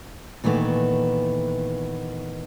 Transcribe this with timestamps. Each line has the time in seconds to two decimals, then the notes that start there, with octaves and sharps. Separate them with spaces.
0.44 A#2 D#3 E3 A3 B3